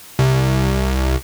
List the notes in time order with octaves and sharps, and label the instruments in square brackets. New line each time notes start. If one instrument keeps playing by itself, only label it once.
[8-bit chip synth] C2